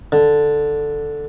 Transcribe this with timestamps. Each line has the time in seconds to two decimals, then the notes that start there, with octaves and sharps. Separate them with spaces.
0.12 D3